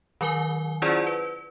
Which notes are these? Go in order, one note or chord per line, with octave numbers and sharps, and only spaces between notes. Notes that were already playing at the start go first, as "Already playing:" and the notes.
D#3 F#3 A#4 G#5 G7
C#4 E4 F4 G#4 C5 D5
B4